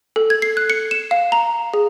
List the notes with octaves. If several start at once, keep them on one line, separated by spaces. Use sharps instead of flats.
A4
G#6
C7
F#6
C#7
E7
F5
A#5
G#4